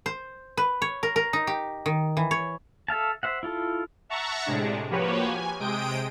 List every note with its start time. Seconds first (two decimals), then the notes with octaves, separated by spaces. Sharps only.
0.06 C5
0.57 B4
0.82 C#5
1.03 A#4
1.16 A#4
1.33 D#4
1.47 G4
1.86 D#3
2.17 E3
2.31 C#5
2.88 A4 E5 F5 A5
3.23 C5 E5 F#5
3.43 E4 F4 A4
4.09 E5 F#5 A5 A#5 C#6
4.46 A2 C3 G#3 D4
4.90 F3 A#3 F#4 G4 B4 C#5
5.25 G#5
5.59 C3 G#3 G5 D#6 D7